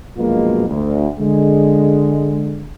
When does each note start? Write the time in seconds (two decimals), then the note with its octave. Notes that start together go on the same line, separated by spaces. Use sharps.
0.17 A#1 F#2 B2 G#3 A#3 F4
0.68 D2
1.20 D3 G#3